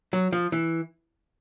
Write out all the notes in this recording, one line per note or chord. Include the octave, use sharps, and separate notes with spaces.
F#3
F3
E3